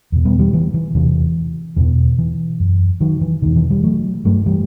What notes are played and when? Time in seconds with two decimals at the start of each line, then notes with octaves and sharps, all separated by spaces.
0.12 E2 B2
0.25 G3 B3
0.39 E3 G3
0.53 E3 G3
0.74 E3
0.95 E2 C3 E3
1.76 E2 B2 E3
2.19 E3
2.60 F#2
3.01 D#3 F#3
3.21 E3
3.42 E2 B2 D#3
3.56 E3
3.70 E3 G3
3.83 F#3 A3
4.25 G2 F#3 A3
4.46 E3 G3